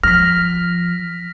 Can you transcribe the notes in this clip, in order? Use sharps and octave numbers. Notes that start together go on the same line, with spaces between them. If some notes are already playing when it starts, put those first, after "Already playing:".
F3 F6 A#6 B6